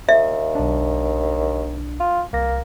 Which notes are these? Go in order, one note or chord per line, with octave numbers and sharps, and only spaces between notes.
D#2 E5
B1 D4
F4
C2 A#3 A#6